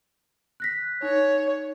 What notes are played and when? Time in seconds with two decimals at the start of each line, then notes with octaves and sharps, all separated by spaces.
0.60 F#6 A#6 B6
1.02 D#4 C#5